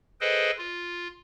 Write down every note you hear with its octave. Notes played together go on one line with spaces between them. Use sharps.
G#4 A4 B4 C5 D#5 G5
F4